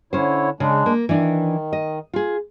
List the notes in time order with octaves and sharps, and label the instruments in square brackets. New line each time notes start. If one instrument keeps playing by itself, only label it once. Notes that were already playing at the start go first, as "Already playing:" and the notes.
[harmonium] D3 E4 C#5 [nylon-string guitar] C#4 C5
[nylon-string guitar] C#3 [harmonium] G#3 D4
[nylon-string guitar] A#3
[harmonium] D#3 [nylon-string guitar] E3 D4
[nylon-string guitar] D#5
F4 G#4